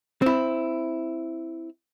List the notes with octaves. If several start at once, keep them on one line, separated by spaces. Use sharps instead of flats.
C4 E4